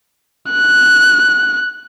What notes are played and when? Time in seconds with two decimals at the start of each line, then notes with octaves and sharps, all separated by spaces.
0.51 F#6